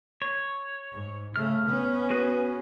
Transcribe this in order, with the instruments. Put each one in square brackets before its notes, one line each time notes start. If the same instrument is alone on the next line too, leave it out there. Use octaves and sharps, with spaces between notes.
[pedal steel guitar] C#5
[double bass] G#2
[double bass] C#3 A3 [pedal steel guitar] F6
[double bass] B3 C#4
[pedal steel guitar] F#4 G#4 B4